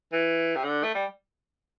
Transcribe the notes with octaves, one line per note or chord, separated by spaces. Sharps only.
E3
C3
D3
A3
G3